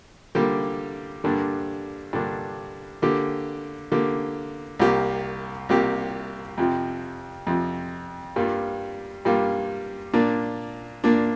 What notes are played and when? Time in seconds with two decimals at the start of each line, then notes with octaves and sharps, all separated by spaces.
0.35 D3 G3 A#3 G4
1.24 G2 D3 A#3 D4
2.13 G2 D3 A#3 D4
3.02 D3 A#3 G4
3.92 D3 A#3 G4
4.79 C2 C3 A#3 G4
5.69 C2 C3 A#3 G4
6.58 F2 C3 F3
7.47 F2 C3 F3
8.36 G2 G3 A#3 F4
9.25 G2 G3 A#3 F4
10.14 A#2 A#3 D4
11.04 A#2 A#3 D4